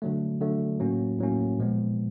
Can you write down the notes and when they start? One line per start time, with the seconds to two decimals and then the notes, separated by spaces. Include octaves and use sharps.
0.02 D3 F#3 A3
0.41 D3 F#3 A3
0.80 A2 F#3 A#3 C#4
1.19 A2 F#3 A#3 C#4
1.59 A#2 F3 G#3 B3